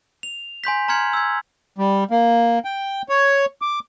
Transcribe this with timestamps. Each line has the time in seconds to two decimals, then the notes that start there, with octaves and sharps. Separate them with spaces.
0.23 F7
0.64 G#5 C6 G6 B6
0.88 A#5 C6 F6 G#6 C#7 F#7
1.13 E6 G#6
1.78 G3
2.11 A#3
2.65 G5
3.09 C#5
3.62 D6